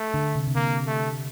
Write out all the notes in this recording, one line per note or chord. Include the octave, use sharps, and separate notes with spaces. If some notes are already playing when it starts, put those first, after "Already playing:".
Already playing: A3
D3
C3
C3
D3 A#3
A3